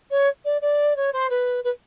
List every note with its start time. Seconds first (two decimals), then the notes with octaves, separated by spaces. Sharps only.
0.10 C#5
0.45 D5
0.61 D5
0.96 C#5
1.12 C5
1.30 B4
1.64 B4